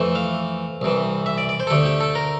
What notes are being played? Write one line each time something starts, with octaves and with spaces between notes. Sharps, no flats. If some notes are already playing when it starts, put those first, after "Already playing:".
Already playing: F2 E3 A3
F5
C2 C3 E3
E5
D5
D5
C5
A4
D2 D3 A3 G4
G4
A4
A#4